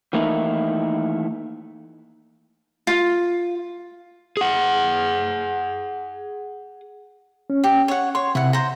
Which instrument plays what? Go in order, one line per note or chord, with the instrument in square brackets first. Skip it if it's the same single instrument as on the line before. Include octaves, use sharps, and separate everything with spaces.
[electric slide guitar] D#3 E3 A3 A#3 D#4 E4
[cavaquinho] F4
[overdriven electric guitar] G#4 F#5
[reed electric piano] C#4
[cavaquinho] G4
C#5 F#5
[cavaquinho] C#5 [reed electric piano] C6
[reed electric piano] C3 [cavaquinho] E4 F#5
[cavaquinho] C5 A#5